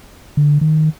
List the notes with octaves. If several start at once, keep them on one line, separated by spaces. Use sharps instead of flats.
D3
D#3